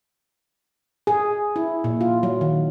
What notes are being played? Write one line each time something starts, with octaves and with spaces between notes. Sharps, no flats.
G#4
E4
A#2
F4
F#3
D#3